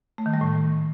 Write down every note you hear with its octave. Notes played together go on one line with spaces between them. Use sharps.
A3
D#3
G3
A2